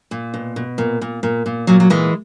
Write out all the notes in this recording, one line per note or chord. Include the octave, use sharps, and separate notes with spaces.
A#2
B2
B2
A#2
A#2
A#2
A#2
A#2 F#3
F#3
A#2 E3 G#3